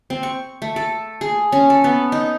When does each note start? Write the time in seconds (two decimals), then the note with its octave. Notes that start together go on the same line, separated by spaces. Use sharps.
0.10 C4
0.23 C#6
0.62 A3
0.76 A4
1.21 G#4
1.52 C#4
1.70 A4
1.84 B3
2.12 D#4